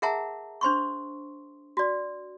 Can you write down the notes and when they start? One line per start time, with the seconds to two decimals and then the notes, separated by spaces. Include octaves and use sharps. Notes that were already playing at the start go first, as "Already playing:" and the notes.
0.02 G#4 A#4 E5 F#5 A5 A#5
0.61 D4 C5 C6 C#6
1.77 F#4 D5